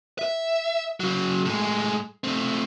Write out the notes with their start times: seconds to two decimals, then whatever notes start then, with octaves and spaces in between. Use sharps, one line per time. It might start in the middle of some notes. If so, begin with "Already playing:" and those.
0.19 E5
1.00 C#3 F#3
1.46 A2 G#3
2.24 A3 C4